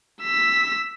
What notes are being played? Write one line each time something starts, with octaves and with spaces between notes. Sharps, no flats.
E6 B6